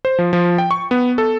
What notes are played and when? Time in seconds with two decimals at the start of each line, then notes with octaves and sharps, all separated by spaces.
0.05 C5
0.19 F3
0.33 F3
0.58 G5
0.71 C#6
0.91 B3
1.18 A4